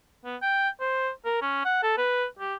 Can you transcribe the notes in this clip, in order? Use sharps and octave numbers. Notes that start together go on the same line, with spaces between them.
B3
G5
C5
A#4
C#4
F#5
A4
B4
G4